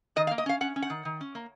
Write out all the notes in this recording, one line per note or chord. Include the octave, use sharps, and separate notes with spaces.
D#3 D#5
F5
A#3
D#5
C#4 F5
C#4 F#5
C#4
F#5
D#3
D#3
C#4
A#3